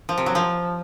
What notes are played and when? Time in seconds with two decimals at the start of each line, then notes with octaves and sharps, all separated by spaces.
0.09 F3
0.18 C3
0.26 F#3
0.35 F3